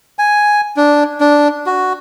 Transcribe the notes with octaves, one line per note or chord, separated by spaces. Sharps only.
G#5
D4
D4
F#4